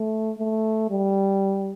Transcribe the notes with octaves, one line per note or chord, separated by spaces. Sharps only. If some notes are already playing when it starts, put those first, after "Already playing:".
Already playing: A3
A3
G3